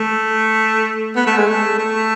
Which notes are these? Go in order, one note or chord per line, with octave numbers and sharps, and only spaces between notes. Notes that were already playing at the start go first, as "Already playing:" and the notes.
Already playing: A3
B3
A3
G#3
A3
A3